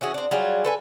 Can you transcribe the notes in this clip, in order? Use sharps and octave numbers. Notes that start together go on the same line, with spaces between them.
E3 C#4 F#4 G#4
C4 D4
F#3 G3 F4 G#4
A4 B4 G#5